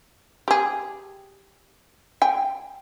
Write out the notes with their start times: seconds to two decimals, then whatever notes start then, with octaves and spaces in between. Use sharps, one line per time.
0.48 G4 G#4
2.22 G5 G#5